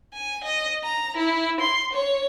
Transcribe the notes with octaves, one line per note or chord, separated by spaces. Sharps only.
G#5
D#5
A#5
E4
C6
C#5